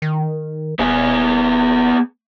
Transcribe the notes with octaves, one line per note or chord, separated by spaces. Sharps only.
D#3
D#1 B3 G#4